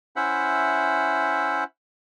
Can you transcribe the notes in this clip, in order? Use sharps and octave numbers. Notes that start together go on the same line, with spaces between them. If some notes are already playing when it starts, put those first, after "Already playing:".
C#4 E4 C5 E5 F#5